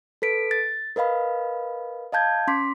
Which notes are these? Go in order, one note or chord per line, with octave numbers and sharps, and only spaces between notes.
A4 B4 B6 D7
A6
A#4 B4 D#5 F5 B5
D#5 F5 A5 G6 G#6
C#4 C6 D6 B6